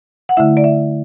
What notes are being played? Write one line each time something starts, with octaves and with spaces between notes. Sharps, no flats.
F#5
D3 A3 E4 E5
D5
E5